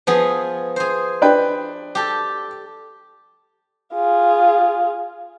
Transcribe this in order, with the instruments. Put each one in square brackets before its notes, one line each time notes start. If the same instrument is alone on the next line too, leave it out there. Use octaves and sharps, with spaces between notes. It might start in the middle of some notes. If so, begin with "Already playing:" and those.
[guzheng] F3 B3 G#4
G#4 C5
[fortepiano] D4 B4 G5
[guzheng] G4 A4
[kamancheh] F4 G#4